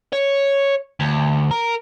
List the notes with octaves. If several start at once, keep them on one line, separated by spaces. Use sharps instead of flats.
C#5
D2
A#4